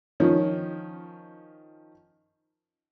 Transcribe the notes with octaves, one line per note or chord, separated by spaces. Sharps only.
D#3 F3 C#4